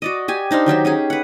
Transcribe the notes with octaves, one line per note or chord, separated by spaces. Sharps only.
F#4 D5 D#5
G4 G#5
D4 D#4 C5 F5
D#3 F#3 G4 C5
C#4 G4 G#4
B4 F#5